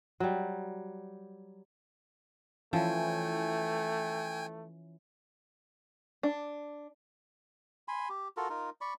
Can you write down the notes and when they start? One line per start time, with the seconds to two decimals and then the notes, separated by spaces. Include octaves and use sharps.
0.20 F#3 G3
2.73 E3 F3 A3 C#4 E4 G5 G#5
6.23 D4
7.88 G#5 B5 C6
8.09 G4
8.37 F4 F#4 A4 A#4
8.50 D#4 F4 A#4
8.81 D5 B5 C#6